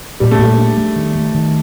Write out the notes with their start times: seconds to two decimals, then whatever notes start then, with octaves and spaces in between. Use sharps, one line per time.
0.20 A#2 G3
0.31 A3
0.39 A#2 G3
0.58 D4
0.77 A3
0.96 D#3
1.15 A3
1.35 D#3